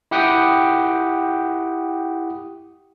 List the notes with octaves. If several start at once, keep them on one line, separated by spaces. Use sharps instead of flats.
E4 G4 F#5 G5 D#6